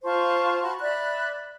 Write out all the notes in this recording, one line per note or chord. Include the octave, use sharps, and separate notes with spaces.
F4 C5 A5 C#6
F#4 A5 B5
D5 E5 B5 F#6